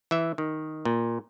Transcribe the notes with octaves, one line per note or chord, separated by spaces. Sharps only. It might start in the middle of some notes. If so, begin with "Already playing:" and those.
E3 E5
D#3
A#2